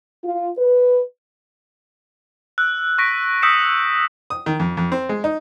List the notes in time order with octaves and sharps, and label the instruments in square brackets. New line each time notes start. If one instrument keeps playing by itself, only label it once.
[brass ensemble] F4
B4
[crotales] E6 F#6
C#6 A#6 B6 D7
D#6 E6 G6 B6 C#7 E7
[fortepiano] D#6
D#3
F2
F2
C4
G#3
D#4